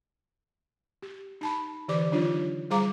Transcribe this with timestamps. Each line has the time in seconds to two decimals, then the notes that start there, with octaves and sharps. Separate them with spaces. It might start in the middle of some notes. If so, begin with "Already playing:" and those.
1.02 G4
1.41 D#4 A5 B5
1.88 D3 E3 G4 D5 D6
2.11 D#3 F#3 D4 D#4 F4 C#5
2.70 G3 G#4 C5 F5 A#5 D6